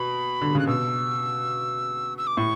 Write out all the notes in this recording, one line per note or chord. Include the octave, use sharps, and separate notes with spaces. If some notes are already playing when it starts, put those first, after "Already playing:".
Already playing: B2 B5
D3
C#3 F#6
B2 E6
E6
D6
A2 C#6